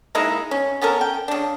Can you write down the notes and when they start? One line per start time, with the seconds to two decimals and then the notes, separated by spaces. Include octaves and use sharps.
0.15 G#3 A#3 D#4 E4
0.51 C#4
0.81 B3 C#4 A4 A#4
1.01 G5
1.28 C#3 D4